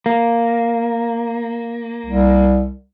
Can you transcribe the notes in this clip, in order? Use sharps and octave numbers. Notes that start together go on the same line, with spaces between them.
A#3
C2